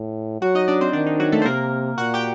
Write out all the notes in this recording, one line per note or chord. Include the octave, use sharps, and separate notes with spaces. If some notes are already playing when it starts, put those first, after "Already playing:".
Already playing: A2
F#3 F#4 F#5
D#4 D#5
D4 D5
C4 C5
D#3 D4
D#4
F#3 F#4
A3 A4
C5
C3 A#3 A#4
A#2 F#4 F#5
G4 G5